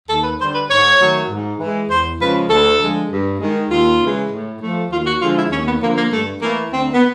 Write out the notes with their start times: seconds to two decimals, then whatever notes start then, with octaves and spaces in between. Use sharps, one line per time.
0.09 D#2 A4
0.23 B4
0.39 D3 G3 C5
0.54 B4
0.69 G#2 C#5
0.99 D#3 F#3 A3
1.30 G#2
1.59 E3 G#3
1.90 E2 C5
2.19 C#3 F3 G#3 B4
2.49 D2 A4
2.79 D3 F3 G#3
3.10 G2
3.39 D#3 G#3
3.70 D#2 F4
4.00 C#3 E3 G#3
4.30 A2
4.60 F3 A3
4.90 D#2 F4
5.05 F#4
5.20 D3 F3 G#3 F4
5.36 E4
5.51 D#2 C#4
5.65 B3
5.81 D3 F3 A#3
5.96 A#3
6.11 G2 A3
6.41 E3 A3 A#3
6.71 D2 C4
6.93 B3